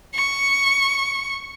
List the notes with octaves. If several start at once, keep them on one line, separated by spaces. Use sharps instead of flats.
C#6